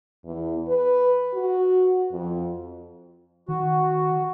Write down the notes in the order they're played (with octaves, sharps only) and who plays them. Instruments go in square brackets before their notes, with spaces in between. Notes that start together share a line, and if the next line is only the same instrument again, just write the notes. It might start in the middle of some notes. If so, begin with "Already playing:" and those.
[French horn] E2
B4
F#4
F2
[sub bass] D#3 [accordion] F#4